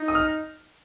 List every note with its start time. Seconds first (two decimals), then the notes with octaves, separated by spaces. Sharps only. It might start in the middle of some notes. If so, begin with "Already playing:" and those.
Already playing: D#4
0.08 D#6
0.15 F6